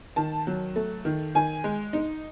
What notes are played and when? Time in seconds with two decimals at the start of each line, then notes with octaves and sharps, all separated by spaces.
0.16 D#3 A5
0.47 F#3
0.76 A3
1.05 D#3
1.35 D#3 G#5
1.64 G#3
1.93 D#4